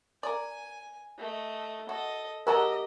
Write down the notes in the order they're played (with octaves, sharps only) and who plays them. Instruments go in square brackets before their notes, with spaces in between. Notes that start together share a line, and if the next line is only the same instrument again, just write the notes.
[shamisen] A#4 D5 [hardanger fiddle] G#5
[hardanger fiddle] A3 D#5
[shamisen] F#4 [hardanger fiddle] A4 D#5
[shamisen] G#3 F#4 A4 [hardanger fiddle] G4 D#5 [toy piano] A#4 A#5